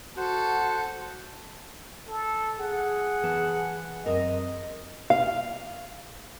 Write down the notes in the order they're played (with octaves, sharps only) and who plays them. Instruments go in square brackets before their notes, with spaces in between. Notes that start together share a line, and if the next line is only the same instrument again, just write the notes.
[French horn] F#4 [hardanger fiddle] A4 [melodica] C5 F#5
[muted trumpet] A4
[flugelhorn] G#4 [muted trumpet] F#5
[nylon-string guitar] E3 B3 A5
[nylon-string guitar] F#2 C4 A#4 [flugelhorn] D#5
[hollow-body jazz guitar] F5